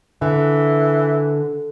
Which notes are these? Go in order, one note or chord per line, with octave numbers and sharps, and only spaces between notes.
D3 E3